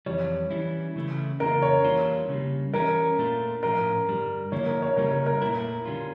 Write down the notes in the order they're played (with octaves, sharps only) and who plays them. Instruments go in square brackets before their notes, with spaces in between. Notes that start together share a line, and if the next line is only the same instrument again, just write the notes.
[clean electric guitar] F2 E3 G3 [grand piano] C#5
[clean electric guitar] E3 G3 C#4 E4
C#3 E3 A3 E4
[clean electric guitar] C#3 E3 A#3 D4 F4 [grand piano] A#4
[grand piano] C#5
[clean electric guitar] E3 G3 A#3 D4 F4
C#3 G3 A#3
[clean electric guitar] E3 G3 C#4 E4 [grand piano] A#4
[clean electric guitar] A#2 A3 D4 F4
[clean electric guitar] A2 F3 C#4 F4 [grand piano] A#4
[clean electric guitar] G2 D3 G3
[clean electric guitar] D3 F3 A#3 E4 [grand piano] C#5
[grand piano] A#4
C#5
[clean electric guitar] C#3 G3 A#3 C#4 [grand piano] A#4
[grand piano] A#4
A#4
[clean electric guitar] A#2 A3 E4 [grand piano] A#4
[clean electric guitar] D3 G3 C#4 F4